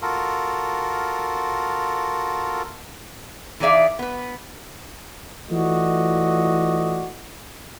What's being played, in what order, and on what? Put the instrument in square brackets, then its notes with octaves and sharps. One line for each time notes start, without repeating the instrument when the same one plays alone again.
[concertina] F4 F#4 A4 A#4
[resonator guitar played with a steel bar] E3 D#4 G#4 D5 E5 F5
B3 B4
[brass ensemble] E3 A3 F4 F#4 D5 D#5